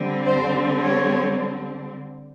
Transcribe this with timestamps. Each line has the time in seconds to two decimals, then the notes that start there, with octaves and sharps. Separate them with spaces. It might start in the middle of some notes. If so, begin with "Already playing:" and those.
Already playing: D3 G3 C4
0.24 C5
0.79 C#5